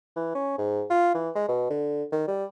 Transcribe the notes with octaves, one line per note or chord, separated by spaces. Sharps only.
E3
C#4
G#2
F4
E3
G#3
B2
D3
D#3
G3